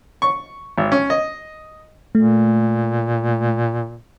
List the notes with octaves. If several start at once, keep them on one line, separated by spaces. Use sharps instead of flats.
C#6
G#1
C#4
D#5
A#2 A3